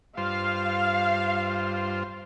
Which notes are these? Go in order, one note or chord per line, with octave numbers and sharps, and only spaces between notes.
G2 F4 C5 F5